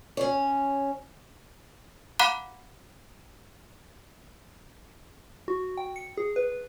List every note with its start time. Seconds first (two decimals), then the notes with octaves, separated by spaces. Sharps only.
0.17 C#4 C#5
2.19 F5 F#5 A#5 B5 D6 F#6
5.48 F#4
5.77 G5
5.96 C#7
6.17 G#4
6.36 B4